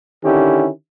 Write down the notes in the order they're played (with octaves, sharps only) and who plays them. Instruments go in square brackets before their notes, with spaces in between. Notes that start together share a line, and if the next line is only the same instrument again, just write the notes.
[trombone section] D3 D#3 C#4 E4 G4